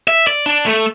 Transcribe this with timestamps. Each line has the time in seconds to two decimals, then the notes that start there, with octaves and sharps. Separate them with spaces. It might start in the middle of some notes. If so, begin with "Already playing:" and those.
0.08 E5
0.27 D5
0.46 D4
0.66 A3